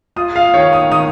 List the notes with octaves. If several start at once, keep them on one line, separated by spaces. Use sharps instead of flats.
F4 D#6
F5
D#3 C#5
D#6
D#3 D#6